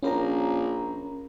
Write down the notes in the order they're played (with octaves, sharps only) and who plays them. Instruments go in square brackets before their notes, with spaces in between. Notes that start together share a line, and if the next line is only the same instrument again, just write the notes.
[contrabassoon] A#1 [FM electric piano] C#4 A#4 A#5